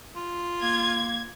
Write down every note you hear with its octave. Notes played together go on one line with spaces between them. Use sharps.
F4
A#3 G#6